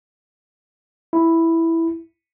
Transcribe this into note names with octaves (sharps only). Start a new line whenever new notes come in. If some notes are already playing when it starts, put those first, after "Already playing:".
E4